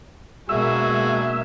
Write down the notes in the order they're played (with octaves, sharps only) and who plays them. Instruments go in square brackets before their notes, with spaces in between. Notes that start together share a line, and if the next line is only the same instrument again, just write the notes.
[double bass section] B2 G#3 A#3 [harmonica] D4 F#4 G#4 [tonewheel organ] E5